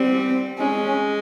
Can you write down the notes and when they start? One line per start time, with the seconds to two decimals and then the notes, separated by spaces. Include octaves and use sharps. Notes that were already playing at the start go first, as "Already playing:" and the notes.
Already playing: G3 C4
0.59 G#3 C#4